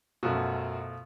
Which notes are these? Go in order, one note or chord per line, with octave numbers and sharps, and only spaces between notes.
F#2 B2 F3 A3 F#4